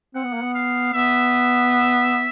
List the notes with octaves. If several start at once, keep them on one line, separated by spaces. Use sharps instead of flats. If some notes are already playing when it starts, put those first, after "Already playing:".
C4 F#5
B3
A#3
B3
F5
B3 E5